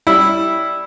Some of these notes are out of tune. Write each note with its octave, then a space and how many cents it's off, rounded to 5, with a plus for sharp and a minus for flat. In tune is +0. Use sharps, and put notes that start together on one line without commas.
G3 +0 E4 +0